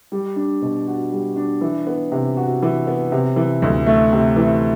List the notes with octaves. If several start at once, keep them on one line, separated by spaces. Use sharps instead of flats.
G3
D4
B2
F#4
G3
D4
E3
B3
C3
F#4
E3
B3
C3
E3
D2
A3
C3
E3